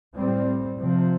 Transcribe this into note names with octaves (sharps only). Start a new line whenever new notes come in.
A2 G3 C4
C3 F3 C4